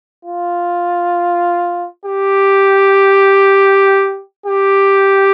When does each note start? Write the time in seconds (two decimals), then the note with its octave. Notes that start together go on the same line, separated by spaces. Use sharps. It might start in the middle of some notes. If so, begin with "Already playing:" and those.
0.25 F4
2.05 G4
4.46 G4